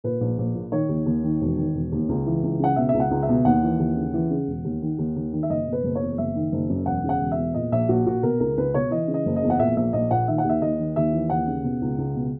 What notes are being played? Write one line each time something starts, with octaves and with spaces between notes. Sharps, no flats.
A#2 B4
A#1
A#1
A#2
D#3 C#5
D#2
D#2
D#3
E1
D#3
E1
D#2
C#2
E3
C#2
C#3 F#5
B2 E5
C#2 E5
F#5
C#2
E5
B2
D#2 F#5
E3
D#2
C#3
E3
C#3
E1
D#2
D#3
D#2
D#2
D#3
E5
F#1 D#5
B2
B4
F#1
C#5
E2
F#1 E5
D#3
F#1
F#2
E1 F#5
C#3 F#5
E1
E5
E2
A#2 D#5
A#1 E5
A#1 F#4
A#2 F#4
B2 A#4
C#2 A#4
C#2 B4
B2 C#5
E3 D#5
C#3
D#5
F#1
D#5
E2
F#5
A#2 E5
A#1 E5
A#1 D#5
A#2 F#5
D#3 E5
F#5
D#2
E5
D#2 D#5
D#3
D#2 E5
E3
D#2 F#5
C#3
B2
C#2
C#2
B2